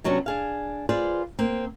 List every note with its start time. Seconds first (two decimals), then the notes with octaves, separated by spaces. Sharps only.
0.04 C3 F#3 B3 C#4 D4
0.26 D4 G#4 F5
0.89 F4 G#4 B4 C5 D5
1.39 A#3 C4